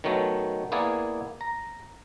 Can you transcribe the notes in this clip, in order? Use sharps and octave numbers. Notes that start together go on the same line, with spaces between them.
D#3 F#3 A3 B3
A#3 B3 E4 G#4 D5
A#5